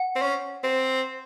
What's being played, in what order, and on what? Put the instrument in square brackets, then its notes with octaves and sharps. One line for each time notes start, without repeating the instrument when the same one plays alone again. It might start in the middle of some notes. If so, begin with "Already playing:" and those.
Already playing: [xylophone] F#5
[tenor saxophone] C4
C#4
C4